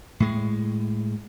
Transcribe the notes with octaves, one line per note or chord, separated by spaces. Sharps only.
A2 G#3